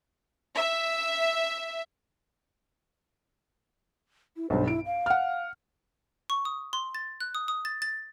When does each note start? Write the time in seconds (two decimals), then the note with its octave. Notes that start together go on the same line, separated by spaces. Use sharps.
0.56 E5
4.37 E4
4.50 B1 G2 C5
4.68 E4 D7
4.86 F5
5.06 F#5 F6
6.30 C#6
6.45 D#6
6.73 C6
6.95 A6
7.21 F#6
7.35 D#6
7.48 D#6
7.65 A6
7.82 A6